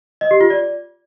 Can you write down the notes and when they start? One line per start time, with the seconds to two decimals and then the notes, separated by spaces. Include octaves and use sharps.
0.21 D#5
0.31 G4
0.41 F4
0.50 D5